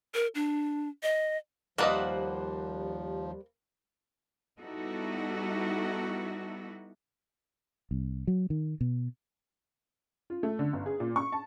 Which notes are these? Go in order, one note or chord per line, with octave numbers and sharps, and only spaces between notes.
A#4
D4
D#5
D#2 F3 G3 A#3 B4 C5 D#5 F#5
G3 B3 D#4 E4 F#4 A4
C2
F#3
D#3
B2
F4
A3
D3
G1
G#4
A#2
C#6
A5